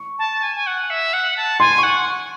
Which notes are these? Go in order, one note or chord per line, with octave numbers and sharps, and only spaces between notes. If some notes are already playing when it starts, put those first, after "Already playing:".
Already playing: C#6
A5
G#5
G#5
F#5
E5
F#5
A5
G#5 C6
C#6
F#5